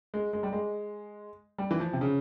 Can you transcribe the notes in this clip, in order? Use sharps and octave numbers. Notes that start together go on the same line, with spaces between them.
G#3
G#3
G3
G#3
G3
E3
F3
C3
C#3